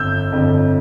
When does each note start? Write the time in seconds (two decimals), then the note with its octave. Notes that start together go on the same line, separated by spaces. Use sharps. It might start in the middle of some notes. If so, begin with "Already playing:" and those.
Already playing: G1 F2 D3 E6 G6
0.32 G1 F2 D3